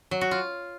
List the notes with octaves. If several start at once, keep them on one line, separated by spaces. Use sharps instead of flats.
F#3
F#4
F4